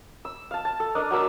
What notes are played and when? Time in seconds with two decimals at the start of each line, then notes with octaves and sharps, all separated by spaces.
0.25 E6
0.51 F5 A5
0.65 A5
0.80 A4
0.95 D4 A#4 D#5
1.11 F#3 A#4 A5 E6